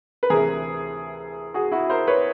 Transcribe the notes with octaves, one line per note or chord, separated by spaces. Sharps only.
B4
D2 C3 E3 G#4 A#4
F#4 G#4
E4 F#4
A#4 C5
B4 C#5